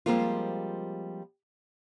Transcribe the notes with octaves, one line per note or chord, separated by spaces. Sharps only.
F3 G3 G#3 A#3 C4 F4